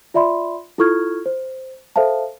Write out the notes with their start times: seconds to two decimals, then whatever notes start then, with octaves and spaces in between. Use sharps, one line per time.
0.14 F4 D5 E5 B5 C6
0.78 E4 F4 A4 C#6 F6 G#6
1.26 C5
1.96 A4 C5 E5 F5 A5